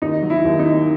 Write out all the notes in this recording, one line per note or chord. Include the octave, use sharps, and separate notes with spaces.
D#2 D#4
F#3
E4
D#2
D#4
D#3